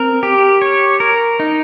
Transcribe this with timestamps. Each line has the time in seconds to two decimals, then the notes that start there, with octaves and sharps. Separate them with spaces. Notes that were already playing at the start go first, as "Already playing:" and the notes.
Already playing: C4 A#4
0.23 G4
0.62 C#5
1.00 A#4
1.40 D#4